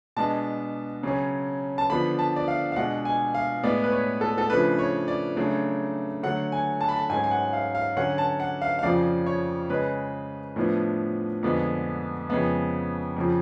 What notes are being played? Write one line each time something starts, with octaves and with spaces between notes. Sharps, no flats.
B2 G#3 B3 D4 A5
C#3 F#3 C#4
A5
D3 F3 B3 D4 B5
A5
D5
F5
F5
B2 G#3 D4 F#5
G#5
F5
A2 G#3 B3 D5
B4
C#5
A4
A4
C#3 F3 A3 D4 B4
C#5
D5
C#3 F#3 A3 D4
D3 F#3 A3 F#5
G#5
A5
B5
A5
G#2 F#3 C#4 G#5
G#5
F#5
F5
F5
D3 F#3 C#4 F#5
A5
F#5
F5
F5
F2 C#3 F3 D5
C#5
C#3 G#3 C#4 B4
A2 F3 B3 D4
F2 D3 G#3 B3 D4
F2 C#3 G#3 B3
F2 C#3 F3